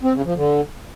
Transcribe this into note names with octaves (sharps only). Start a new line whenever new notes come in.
C4
C#3
F3
D3